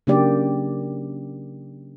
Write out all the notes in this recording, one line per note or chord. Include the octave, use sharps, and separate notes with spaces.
C#3 F#3 A#3 D4 G4 D5